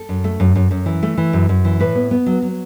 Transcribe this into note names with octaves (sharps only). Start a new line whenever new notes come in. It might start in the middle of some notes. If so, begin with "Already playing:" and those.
Already playing: A4
F#2
A3
F#2
F#2
F#2
E3
A3
E3
F#2
F#2
E3
A2 B4
B3
B3
F#3
F#3